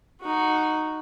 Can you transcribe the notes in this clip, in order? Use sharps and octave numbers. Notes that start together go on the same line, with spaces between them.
D#4 F#4